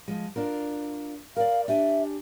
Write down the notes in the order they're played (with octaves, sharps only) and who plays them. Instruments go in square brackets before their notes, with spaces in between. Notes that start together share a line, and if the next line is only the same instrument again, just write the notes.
[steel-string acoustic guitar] F3 G#3
D4 F4 A#4
[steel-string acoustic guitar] A#4 D5 [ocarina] F5
[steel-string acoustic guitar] D4 G4 G#5 [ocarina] E5